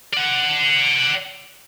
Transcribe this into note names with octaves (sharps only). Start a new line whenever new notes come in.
D5 F#5